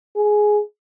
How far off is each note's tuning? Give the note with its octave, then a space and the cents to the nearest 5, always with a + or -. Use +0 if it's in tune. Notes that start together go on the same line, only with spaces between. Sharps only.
G#4 +10